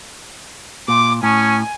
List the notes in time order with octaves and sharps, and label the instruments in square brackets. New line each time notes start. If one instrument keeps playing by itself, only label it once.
[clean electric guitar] A#2 [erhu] D6
[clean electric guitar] A2 [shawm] C#4 [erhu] G#5